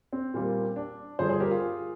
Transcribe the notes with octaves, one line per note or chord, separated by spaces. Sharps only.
C4
A#2 G3 A#3
D4
G2 D3 F3 G#4 C5
G#4 C5
G4 A#4
F4 G#4